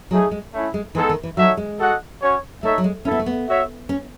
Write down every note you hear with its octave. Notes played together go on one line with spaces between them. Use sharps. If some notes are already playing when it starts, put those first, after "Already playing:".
F#3 A3 D#4 G#4
G#3
A3 C#4 E4
G#3
E3 G#3 B3 D#4 A4
D#3
E3
F#3 D#4 F#4 A4 C#5 E5
G#3
F#4 A4 D#5 F#5
C#4 F#4 C#5
A3 D#4 A4 C#5 E5
F#3
G#3
C#4 E4 A4 E5
B3
A3
B3
F#4 C#5 E5
C#4